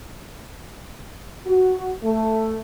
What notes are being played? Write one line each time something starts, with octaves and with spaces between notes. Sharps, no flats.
F#4
A3